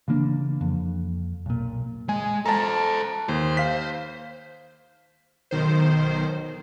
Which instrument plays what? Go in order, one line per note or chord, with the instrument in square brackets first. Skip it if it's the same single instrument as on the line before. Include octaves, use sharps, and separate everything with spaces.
[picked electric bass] C#3 E3 A#3 D4
F2
B1 A#2
[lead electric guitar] G#3 [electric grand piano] G#5
[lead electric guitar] A4 C5 [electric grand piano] A5 A#5
[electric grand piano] D#2 [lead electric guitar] C5
[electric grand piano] F5 B6
[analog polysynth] B1 D#3 C5